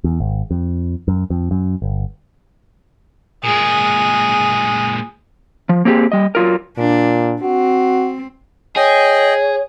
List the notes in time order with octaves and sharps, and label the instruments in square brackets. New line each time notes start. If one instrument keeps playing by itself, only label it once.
[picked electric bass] E2
G#1
F2
F#2
F2
F#2
G1
[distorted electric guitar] A#2 G#3 [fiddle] G#4
[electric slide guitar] F3
A#3 C4 G4 G#4
G3 D#5
F#3 F4 A#4
[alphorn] A#2 [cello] D4
[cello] C4 [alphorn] F#4
[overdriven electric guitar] G#4 [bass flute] C#5 [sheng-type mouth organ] D#5 G5